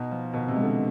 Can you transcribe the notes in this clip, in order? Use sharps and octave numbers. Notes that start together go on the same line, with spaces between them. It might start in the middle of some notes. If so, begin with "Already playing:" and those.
Already playing: B2 D#4
F3
B2 D#3
C3
G#3
D3